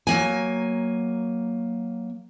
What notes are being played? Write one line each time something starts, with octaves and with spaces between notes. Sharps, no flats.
F#3 A#3 G#5